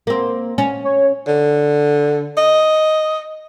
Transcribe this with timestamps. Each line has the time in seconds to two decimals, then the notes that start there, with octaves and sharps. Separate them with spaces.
0.07 A#3 C4
0.58 C#4
0.84 C#5
1.27 D3
2.37 D#5